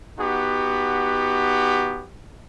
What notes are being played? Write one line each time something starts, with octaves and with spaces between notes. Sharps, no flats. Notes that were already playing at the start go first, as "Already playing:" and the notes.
B3 D#4 F#4 G4